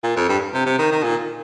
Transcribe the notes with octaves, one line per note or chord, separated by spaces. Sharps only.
A#2
F2
G2
C3
C3
D#3
D#3
A#2